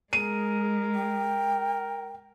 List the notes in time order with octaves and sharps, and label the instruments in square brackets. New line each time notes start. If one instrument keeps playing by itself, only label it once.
[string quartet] G#3 [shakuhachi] G#4 [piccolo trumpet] A#4 [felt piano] D#7
[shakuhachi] G5